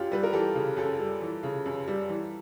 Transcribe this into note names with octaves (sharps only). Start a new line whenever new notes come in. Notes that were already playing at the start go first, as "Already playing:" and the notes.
Already playing: F#2 F4 G4
G3 B4
A#4
E3 G4 A4
C#3
F#2 G4 A4
G3
E3
C#3
F#2
G3
E3